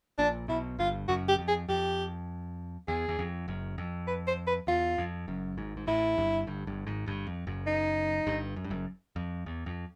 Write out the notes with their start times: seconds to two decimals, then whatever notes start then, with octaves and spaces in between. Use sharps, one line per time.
0.19 A#1 A#2 D4
0.48 B1 B2 E4
0.79 G1 G2 F4
1.08 F#1 F#2 F#4
1.29 G4
1.39 F2
1.48 G#4
1.69 F2 G4
2.88 E2 G#4
3.09 E2
3.19 F2
3.48 F#1 F#2
3.78 F2
4.08 B4
4.27 C5
4.47 B4
4.67 E2 F4
4.98 F2
5.28 F#1 F#2
5.57 G#1 G#2
5.77 G#2
5.87 A1 A2 E4
6.17 G1 G2
6.47 G1 G2
6.67 G1 G2
6.87 G#1 G#2
7.06 G1 G2
7.27 F2
7.47 F#1 F#2
7.67 D#4
8.27 G1 G2
8.56 F#2
8.64 G2
8.70 F#1 F#2
9.16 F2
9.46 E2
9.66 F2